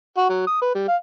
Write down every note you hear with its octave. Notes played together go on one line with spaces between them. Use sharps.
F#4
F#3
D#6
B4
G3
F5